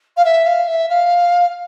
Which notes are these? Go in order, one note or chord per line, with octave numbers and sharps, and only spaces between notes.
F5
E5
F5
E5
F5